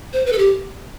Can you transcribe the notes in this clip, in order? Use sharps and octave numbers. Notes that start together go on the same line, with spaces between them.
C5
B4
A4
G4